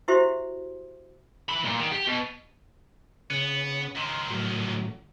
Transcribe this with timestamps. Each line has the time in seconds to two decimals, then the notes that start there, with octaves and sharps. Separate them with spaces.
0.08 E4 F#4 G4 C5 E5 C6
1.49 E3 B5
1.64 A#2
1.79 D#3
1.92 G4
2.07 B2
3.30 C#3 B3
3.96 C#2 D#3 C6
4.30 A2 F#3